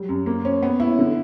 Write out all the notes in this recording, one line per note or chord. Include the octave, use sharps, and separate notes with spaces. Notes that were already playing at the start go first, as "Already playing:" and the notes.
Already playing: F#3 G3
F#2
A#3
C#4
B3
E4
D3